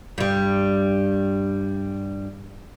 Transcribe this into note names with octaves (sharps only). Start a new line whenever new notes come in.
G2 G3